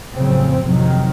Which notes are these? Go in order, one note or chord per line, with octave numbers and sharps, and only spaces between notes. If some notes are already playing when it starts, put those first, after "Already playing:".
A1 F2 C#3 F#3 C4
F2 C3 D#3 F#3